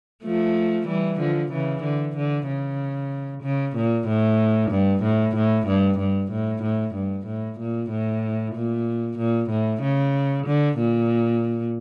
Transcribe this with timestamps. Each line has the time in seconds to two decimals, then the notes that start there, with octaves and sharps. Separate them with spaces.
0.24 F3 A3
0.88 E3 G3
1.20 D3 F3
1.52 C#3 E3
1.84 D3
2.17 D3
2.48 C#3
3.43 C#3
3.76 A#2
4.08 A2
4.71 G2
5.03 A2
5.36 A2
5.67 G2
5.99 G2
6.32 A2
6.63 A2
6.95 G2
7.27 A2
7.60 A#2
7.90 A2
8.55 A#2
9.18 A#2
9.51 A2
9.82 C#3
10.47 D3
10.78 A#2